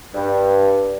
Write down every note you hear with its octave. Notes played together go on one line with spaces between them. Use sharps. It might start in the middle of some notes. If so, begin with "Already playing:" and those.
G2